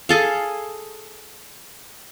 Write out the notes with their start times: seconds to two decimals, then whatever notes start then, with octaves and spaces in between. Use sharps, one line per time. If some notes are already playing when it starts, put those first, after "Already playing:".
0.09 G#4 A4 F5